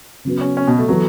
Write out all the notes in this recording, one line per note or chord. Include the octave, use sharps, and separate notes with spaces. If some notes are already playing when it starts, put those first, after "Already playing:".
C#3 F#3 B3
C#4
C#4
B2
A3
E3 F#3 B3 F#4 A4